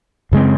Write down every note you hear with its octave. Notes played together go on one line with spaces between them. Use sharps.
F#2 C#3 G#3 C4